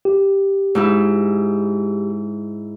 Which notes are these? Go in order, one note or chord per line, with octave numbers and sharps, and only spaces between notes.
G4
G#2 D#4 E4